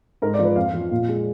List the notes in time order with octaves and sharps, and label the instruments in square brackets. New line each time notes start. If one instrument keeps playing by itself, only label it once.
[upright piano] G#2 A#4
D5
F3
B4
F2 F5
F3
A#2
G#3